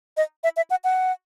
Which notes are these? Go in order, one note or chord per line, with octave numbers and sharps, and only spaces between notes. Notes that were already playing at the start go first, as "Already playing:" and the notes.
D#5
E5
E5
F#5
F#5